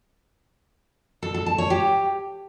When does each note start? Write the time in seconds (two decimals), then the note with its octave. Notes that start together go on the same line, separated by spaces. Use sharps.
1.23 A4
1.34 A4
1.46 A5
1.58 C#5
1.70 G4